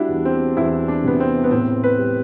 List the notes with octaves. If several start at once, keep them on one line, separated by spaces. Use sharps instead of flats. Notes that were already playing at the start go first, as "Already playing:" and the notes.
Already playing: G3 D4 E4 F#4
E2
C4
E2 E4
D4
C3 B3
C4
B3
A2 C4
B4
G3